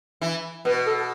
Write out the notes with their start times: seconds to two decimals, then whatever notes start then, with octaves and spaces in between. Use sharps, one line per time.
0.21 E3
0.65 B2 B4
0.87 A4